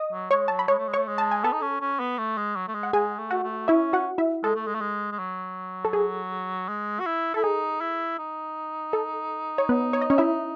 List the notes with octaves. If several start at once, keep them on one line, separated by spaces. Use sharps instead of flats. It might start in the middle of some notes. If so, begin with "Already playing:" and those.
Already playing: D#5 D#6
F#3
G#3 C#5 C#6
F#3 A5
B5
G#3 C#5 C#6
A3
G#3
A3 C#5 C#6
G#3
A5
G#5
B3 A4 A5
D#4
C#4
C#4
B3
A3
G#3
F#3
A3
G#3
F#5
G#3 G#4 G#5
A3
F#4 F#5
A3
C#4 E4 E5
F#4 F#5
E4 E5
G#3 A4
A3
G#3
A3
G#3
G#3
F#3
A4
G#4
G#3
F#4
E4
E4 A4
D#4 G#4
E4
D#4
A4
C#5
B3 B4
C#5
D#5
C#4 C#5
E4 E5